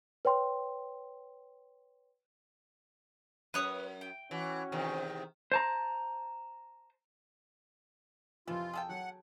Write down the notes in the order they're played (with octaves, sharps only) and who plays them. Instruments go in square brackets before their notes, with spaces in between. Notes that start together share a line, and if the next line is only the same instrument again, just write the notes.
[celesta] B4 C#5 G5 C6
[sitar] F#2 [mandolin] B4 C#5 D#6
[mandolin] G5
[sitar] E3 [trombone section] C#4 F#4
[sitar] E2 C3 D#3
[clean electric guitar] C5 A5 A#5
[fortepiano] F2 C3 F3 [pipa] E3 [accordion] F4
[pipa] G#4 A4 G5
[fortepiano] F#3 [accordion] F#5